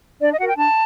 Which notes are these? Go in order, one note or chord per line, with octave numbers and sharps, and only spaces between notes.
D4 D5
D#5
F#4 A#4 F#5
G5
D4 A5